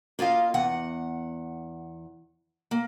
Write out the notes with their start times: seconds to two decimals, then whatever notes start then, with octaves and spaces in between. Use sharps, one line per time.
0.19 A#3 F4 D#5 F5
0.54 E2 F#5
2.71 A#3